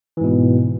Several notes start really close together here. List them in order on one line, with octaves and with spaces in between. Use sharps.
E3 G#2 B2